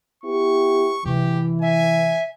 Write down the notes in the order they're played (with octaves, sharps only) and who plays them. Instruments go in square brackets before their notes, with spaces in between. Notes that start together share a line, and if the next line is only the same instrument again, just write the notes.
[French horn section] B3 E4 G4 [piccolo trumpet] C#6
[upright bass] C3 A3 [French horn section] E3 [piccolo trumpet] G4
[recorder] E5 [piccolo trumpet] G#5